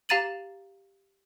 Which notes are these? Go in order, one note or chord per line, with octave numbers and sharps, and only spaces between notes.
G4 F5 A#5 A6 D#7 F#7